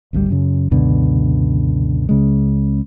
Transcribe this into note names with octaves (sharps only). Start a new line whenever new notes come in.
G#1 D2 C3 G3
F#2 C#3
C#2 F#2 B2 D3
C#2 C#3 G#3